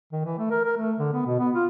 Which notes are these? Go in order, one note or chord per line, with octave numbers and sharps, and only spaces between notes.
D#3
E3
A3
A#4
A#4
A3
D3
B3
B2
B3
F4